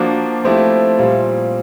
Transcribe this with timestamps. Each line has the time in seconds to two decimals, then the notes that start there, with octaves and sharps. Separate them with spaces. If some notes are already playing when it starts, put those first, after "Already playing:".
Already playing: F3 A#3 D4 F#4
0.45 F3 A3 C4 E4 G4
0.99 A#2 G3 C4 F4